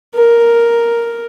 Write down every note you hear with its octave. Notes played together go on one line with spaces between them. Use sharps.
A#4